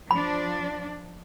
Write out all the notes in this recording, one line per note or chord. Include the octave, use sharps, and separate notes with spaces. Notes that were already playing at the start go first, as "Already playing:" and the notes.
F3 D4 B5